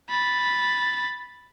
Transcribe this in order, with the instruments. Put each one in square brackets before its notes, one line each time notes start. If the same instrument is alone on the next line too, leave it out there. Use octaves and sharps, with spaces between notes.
[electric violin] B5 A6